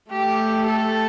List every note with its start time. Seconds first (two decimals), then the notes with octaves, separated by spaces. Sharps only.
0.11 A3 G4
0.66 A4